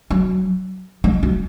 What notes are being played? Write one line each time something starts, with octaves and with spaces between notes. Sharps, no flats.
F#3
G#3
F#3